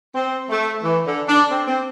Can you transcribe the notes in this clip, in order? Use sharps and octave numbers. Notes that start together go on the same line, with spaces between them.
C4
A3
E3
D3
D4
C4
C4